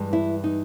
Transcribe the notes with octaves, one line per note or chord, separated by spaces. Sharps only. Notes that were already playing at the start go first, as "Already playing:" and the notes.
Already playing: G2 E3 G#3
E4
D#4